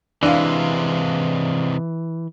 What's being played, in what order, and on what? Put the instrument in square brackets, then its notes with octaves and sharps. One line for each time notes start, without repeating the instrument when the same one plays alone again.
[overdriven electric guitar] C3 G#3 [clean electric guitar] E3 [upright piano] D4 F5